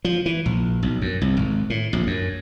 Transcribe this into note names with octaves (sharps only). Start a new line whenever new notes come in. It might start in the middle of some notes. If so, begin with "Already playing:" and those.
F3
E3
A#1
B1
F#2
C2
G#1
A2
A#1
F#2